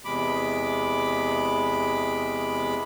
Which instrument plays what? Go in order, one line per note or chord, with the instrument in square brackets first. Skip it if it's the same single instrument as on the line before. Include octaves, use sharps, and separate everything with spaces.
[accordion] E2 C3 G#3 B5 D6